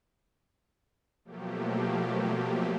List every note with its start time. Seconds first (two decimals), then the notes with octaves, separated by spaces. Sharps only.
1.25 B2 F3 F#3 A3 A#3 G4